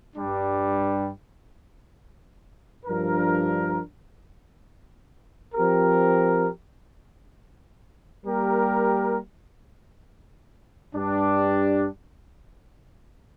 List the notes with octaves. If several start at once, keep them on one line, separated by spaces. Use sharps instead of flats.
G2 G3 D4
G2 F3 D4 A#4
F3 C4 G4 A#4
G3 A#3 G4 A#4
G2 G3 D4 G4